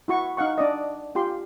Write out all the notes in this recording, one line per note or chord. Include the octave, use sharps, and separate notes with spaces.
E4 F#4 C#6
D#4 F5 F#5 C#6
D4 D5 D#5
F4 G4 C6